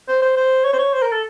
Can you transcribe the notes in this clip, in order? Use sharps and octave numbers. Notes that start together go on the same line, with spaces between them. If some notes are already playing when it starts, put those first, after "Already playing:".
C5
C5
C5
C#5
C5
C#5
C5
A#4
A4